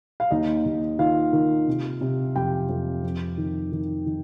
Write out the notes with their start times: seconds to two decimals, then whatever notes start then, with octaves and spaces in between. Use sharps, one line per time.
0.20 F5
0.31 D#2 D#4 D#5
0.65 D#2
0.99 D#3 F4 F5
1.33 D#3
1.67 C3
2.01 C3
2.36 F2 G4 G5
2.69 F2
3.03 F2
3.38 D#3
3.72 D#3
4.06 D#3